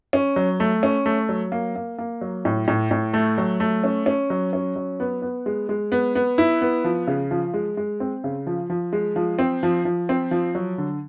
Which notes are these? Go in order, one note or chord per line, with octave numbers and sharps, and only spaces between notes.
C#4
F#3
A3
C#4
A3
F#3
A#3
A#3
A#3
F#3
A2
A2
A2
A3
F#3
A3
C#4
C#4
F#3
C#4
F#3
B3
B3
G#3
G#3
B3
B3
E4
B3
F3
C#3
F3
G#3
G#3
C4
C#3
F3
F3
G#3
F3
C4
F3
F3
C4
F3
F#3
D3